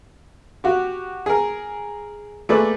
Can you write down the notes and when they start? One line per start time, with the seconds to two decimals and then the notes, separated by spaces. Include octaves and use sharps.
0.64 F#4 G4
1.26 G#4 A#4
2.49 A3 A#3 G#4 B4 D5 E6